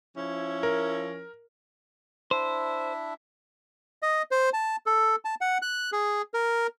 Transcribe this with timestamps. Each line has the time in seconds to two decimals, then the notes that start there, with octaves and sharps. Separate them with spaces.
0.16 F3 C#4 E4
0.63 A#4
2.31 D4 E4 C5 E5
4.02 D#5
4.31 C5
4.53 A5
4.86 A4
5.25 A5
5.41 F#5
5.62 F#6
5.92 G#4
6.34 A#4